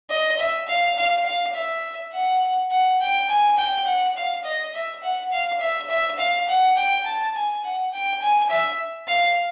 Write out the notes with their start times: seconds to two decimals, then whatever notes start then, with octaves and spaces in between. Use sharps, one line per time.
0.10 D#5
0.39 E5
0.68 F5
0.98 F5
1.26 F5
1.55 E5
2.13 F#5
2.71 F#5
3.01 G5
3.30 G#5
3.57 G5
3.86 F#5
4.17 F5
4.44 D#5
4.74 E5
5.03 F#5
5.32 F5
5.60 E5
5.90 E5
6.19 F5
6.48 F#5
6.77 G5
7.06 A5
7.35 G#5
7.64 F#5
7.93 G5
8.22 G#5
8.50 E5
9.08 F5